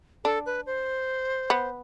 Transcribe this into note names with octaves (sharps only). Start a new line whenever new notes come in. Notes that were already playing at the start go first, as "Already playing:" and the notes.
D4 A4
B4
C5
B3